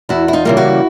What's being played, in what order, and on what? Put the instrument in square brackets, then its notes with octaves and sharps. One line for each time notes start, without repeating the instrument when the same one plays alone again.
[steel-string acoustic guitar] E2 E4 F#4
E4
D#4 F4
C#3 E3 G3 A#3
E4 F#4